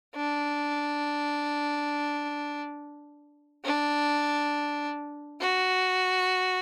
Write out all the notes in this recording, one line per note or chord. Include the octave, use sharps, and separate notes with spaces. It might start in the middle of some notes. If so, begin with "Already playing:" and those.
D4
D4
F#4